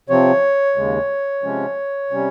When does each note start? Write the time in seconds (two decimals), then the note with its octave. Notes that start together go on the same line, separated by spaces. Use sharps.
0.09 C3 F3 C4 C#5
0.76 D#2 C#3 G#3
1.43 C3 F3 G#3 C#4
2.11 C3 G3 C#4